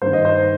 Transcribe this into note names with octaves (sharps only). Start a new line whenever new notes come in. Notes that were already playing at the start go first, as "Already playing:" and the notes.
G2 D#3 C5
D#5
C5